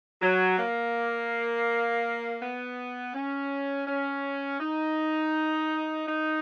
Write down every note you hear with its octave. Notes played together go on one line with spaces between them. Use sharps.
F#3
A#3
B3
C#4
C#4
D#4
D#4